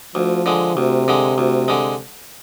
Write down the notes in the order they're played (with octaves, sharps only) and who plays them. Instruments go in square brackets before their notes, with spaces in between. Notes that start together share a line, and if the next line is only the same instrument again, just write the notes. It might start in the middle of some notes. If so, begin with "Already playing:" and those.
[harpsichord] D2 [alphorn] F3
[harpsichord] D3 G#3
[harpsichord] D2 [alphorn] C3
[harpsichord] D3 G#3
D2
D3 G#3